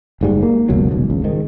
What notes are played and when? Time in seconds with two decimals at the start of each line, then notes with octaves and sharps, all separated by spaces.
0.21 F#1 G#2 G3
0.43 A#3
0.69 F#1 C#2 B2 F#3
0.91 D#1 B1
1.09 G#1 C#2
1.24 G#2 D#3